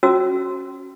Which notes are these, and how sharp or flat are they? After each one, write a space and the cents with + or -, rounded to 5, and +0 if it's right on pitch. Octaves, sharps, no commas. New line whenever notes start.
C#4 -10 F#4 +0 E6 +0